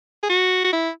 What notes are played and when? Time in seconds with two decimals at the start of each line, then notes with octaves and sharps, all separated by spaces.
0.23 G#4
0.30 F#4
0.65 F#4
0.73 E4